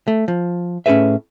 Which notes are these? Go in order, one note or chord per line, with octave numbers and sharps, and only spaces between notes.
A3
F3
A2 C#4 F4 G#4 B4 E5